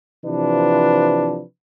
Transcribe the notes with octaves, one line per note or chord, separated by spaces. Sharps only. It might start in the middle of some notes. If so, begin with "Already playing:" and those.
C3 E3 F3 D4 B4